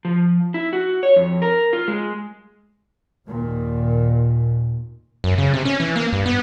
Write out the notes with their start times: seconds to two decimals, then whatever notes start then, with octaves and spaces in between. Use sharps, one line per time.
0.05 F3
0.54 E4
0.73 F#4
1.03 C#5
1.16 F2
1.42 A#4
1.73 F4
1.88 G#3
3.27 D#2 A#2 D#3
5.24 F#2
5.38 C#3
5.54 C3
5.65 C#4
5.80 E3
5.96 A#3
6.13 G2
6.26 B3